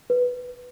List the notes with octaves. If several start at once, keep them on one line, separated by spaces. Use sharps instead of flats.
B4